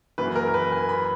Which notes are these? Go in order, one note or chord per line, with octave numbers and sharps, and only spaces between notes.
F#2 E3 A#3 B4
A#4
A#4
B4
G#5
B5